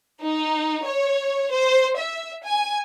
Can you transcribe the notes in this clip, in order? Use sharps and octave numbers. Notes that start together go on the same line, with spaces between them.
D#4
C#5
C5
E5
G#5